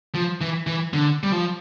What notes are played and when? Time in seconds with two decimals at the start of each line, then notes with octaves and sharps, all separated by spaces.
0.15 F3
0.41 E3
0.67 E3
0.93 D3
1.23 G3
1.32 F3